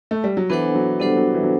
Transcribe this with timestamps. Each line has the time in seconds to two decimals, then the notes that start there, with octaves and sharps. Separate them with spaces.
0.11 A3
0.24 G3
0.37 F#3
0.50 E3 B3 D4 A4 C5 F#5
0.75 F#3
1.00 G3 B3 D4 A4 C5 F#5
1.17 F#3
1.34 E3
1.43 F#3